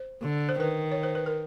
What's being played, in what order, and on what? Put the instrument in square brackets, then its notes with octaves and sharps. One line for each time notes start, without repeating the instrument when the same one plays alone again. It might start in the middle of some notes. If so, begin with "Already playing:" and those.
Already playing: [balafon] C5
[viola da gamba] D3
[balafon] C5
[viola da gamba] D#3 [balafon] B4
[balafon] C#5
C5
B4
A#4